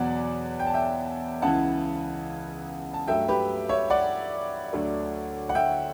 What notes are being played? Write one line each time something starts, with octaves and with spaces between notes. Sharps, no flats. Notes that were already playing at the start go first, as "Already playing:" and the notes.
Already playing: E2 B2 F#3 D5 F#5
G5
A5
E5 G5
C#2 C#3 E3 F#5 A5
A5
G2 F#3 A3 E5 G5
G4 B4
C#5 E5
D5 F#5
D2 D3 F#3 A3
F#5
E5 G5